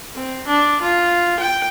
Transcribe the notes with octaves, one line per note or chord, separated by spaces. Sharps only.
C4
D4
F4
G5